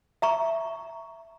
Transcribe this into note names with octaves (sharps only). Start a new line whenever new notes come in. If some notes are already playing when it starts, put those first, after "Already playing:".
E5 A#5 C#6